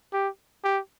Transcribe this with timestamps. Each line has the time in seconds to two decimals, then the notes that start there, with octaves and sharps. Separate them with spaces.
0.13 G4
0.64 G4